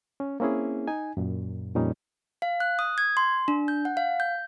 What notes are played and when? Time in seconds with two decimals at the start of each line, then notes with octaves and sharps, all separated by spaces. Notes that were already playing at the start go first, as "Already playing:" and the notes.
0.20 C#4
0.40 A#3 C4 C#4 E4 G#4
0.88 D#4 G#5
1.17 F#2 A#2
1.75 F2 A#2 G3 C#4 D#4
2.42 F5
2.60 F#6
2.79 D#6
2.98 G#6
3.17 C6
3.48 D4
3.68 G6
3.85 F#5
3.97 F5
4.20 G6